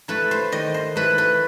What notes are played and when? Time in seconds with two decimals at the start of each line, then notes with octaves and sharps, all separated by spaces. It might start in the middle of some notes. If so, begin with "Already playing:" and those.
0.08 A3 E4 B4
0.31 C5
0.52 D#3 D#5
0.74 C5
0.96 A3 E4 B4
1.18 B4